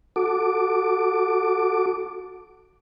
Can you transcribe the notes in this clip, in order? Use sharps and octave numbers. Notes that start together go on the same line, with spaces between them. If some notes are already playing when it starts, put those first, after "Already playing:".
F#4 A4 D6